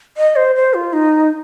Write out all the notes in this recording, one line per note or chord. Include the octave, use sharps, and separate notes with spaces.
D#5
C5
C5
F4
D#4